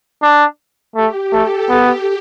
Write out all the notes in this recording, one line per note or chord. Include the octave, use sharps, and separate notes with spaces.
D4
A3 G4
A3 A4
B3 G4